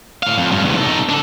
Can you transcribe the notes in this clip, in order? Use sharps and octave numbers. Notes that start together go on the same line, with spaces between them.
A2 F5
F2
G2
E2 C3
D#4 A4
D4 A4